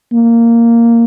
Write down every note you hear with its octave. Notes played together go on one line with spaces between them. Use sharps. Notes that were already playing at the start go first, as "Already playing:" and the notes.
A#3